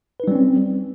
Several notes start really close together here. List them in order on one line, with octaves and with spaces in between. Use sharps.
B4 D#4 G3 C#4 C4